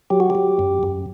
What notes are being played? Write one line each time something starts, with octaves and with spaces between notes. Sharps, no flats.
F#3 G4
F#4
F#3 G4
F#2
F#2